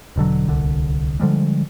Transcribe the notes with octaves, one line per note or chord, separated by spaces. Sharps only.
E1 B2 D3 F#3
D1 C2 D3
D3 F3 G3 G#3